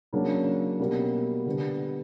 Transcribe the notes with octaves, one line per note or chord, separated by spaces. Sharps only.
C#3 F#3 A#3 D4
B2 G3 A#3
D3 G3 B3